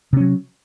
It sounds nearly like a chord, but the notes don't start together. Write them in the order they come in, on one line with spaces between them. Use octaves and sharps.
C3 C#4 F#3